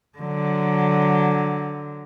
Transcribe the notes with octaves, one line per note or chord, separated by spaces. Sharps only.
D3 F#3